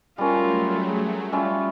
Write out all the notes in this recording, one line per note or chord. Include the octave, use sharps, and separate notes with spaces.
F#3 G3 A3 C#4 F4 A#4
G#4
G3 C#4 F4 E5